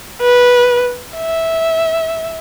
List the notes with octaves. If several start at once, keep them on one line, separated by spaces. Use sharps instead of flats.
B4
E5